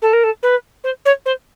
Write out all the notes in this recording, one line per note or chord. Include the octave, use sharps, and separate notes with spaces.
A4
A#4
A4
B4
C5
C#5
C5